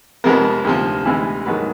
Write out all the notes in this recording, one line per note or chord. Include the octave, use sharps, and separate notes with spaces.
F2 C3 F3 G#3 B3 A#4
D2 C3 F3
D2 C3 E3 G#3 B3
G#2 D#3 F#3 B3 B4